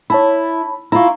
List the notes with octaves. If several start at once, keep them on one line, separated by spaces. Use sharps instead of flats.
E4 C#5 A5 B5
E4 F4 A#5 C#6